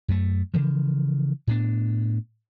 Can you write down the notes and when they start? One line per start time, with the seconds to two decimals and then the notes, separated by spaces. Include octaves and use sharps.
0.08 F#2 A3
0.54 C#3 E3 F3
1.47 A2 B3 D4